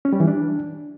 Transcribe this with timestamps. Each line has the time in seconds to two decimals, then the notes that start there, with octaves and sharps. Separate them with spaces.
0.05 C#4
0.13 G3
0.20 E3
0.28 D4